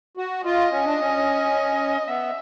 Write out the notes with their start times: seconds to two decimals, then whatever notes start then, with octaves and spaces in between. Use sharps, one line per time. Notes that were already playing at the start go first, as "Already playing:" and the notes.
0.17 F#4
0.45 F4 D#5
0.71 C#4
0.86 D4
1.00 C#4
2.07 B3 E5